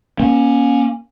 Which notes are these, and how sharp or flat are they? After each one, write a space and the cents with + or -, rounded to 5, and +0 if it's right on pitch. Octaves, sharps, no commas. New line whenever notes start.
A#3 +35 C#4 +0